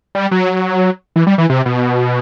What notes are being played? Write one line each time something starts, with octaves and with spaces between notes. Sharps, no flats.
G3
F#3
E3
G3
E3
C3
B2